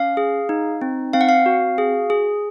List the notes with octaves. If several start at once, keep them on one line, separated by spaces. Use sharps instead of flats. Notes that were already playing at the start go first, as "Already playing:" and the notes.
Already playing: C#4 F5
G#4
D#4
C4
C4 F5
F#5
F5
F#4
G#4
G#4